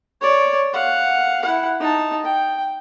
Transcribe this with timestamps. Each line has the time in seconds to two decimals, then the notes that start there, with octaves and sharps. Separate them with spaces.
0.21 C#5 D5
0.73 F5 F#5
1.42 E4 F#5
1.80 D#4 A5
2.25 G5